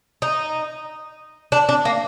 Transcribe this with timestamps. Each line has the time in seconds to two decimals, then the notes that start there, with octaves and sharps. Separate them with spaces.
0.22 D#4
1.52 D4
1.69 D4
1.85 A#3